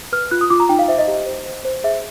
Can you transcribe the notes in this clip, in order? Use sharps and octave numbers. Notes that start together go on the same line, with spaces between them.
B4 F6
F4 F#6
D#6
F4 D6
A#5
D#4 G5
F5
C5 E5
D#5
G4
C5
C5
C5
G#4 E5